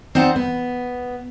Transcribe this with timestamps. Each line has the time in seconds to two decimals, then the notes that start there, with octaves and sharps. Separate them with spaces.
0.15 C4 D#4 C5 D5 F#5
0.36 B3